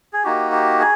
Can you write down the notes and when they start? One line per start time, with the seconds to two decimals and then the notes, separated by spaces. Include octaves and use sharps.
0.13 G#4
0.24 A#3 D#4 F#4 G4
0.52 G4
0.80 G#4